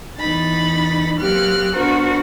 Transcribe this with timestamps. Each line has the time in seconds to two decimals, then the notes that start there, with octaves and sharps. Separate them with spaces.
0.18 E2 D#4 B5 A6
1.19 F#3 A#3 C4 G4 F6 F#6
1.75 B3 D4 F#4 A#4 C5